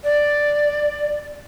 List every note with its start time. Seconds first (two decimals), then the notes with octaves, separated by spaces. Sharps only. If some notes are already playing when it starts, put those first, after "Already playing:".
0.04 D5